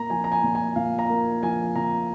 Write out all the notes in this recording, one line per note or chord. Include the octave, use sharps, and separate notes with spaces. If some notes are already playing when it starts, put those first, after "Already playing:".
Already playing: A#2 A#3 A#5
F3 G#5
A#5
G#5
A#2
G#5
A#2 F5
A#5
A#3
F3 G#5
A#2 A#5